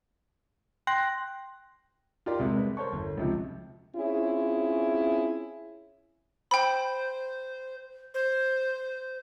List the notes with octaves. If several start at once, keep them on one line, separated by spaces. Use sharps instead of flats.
G5 C6 F#6 A#6
F4 G4 A#4 D5 C6
C2 C3 G#3
B4
A#4 C5 C#5 A5 C#6
G1
C#2 C3 F3
C4 C#4 E4 F4 G#4 C#5
C5 G5 B5
C5